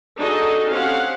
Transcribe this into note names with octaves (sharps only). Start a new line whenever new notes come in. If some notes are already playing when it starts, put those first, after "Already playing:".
D4 D#4 F#4 G#4 A4 D#5
C4 C#4 G4 A4 F5 F#5